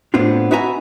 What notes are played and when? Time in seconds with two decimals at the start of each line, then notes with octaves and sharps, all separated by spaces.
0.14 A2 B3 C4 D4 F4
0.51 D#4 F#4 B4 E5 G#5 A#5